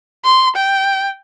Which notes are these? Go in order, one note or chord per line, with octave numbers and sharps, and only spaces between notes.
C6
G5